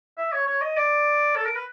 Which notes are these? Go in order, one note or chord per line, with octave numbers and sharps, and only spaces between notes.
E5
C#5
C#5
D#5
D5
A4
A#4
B4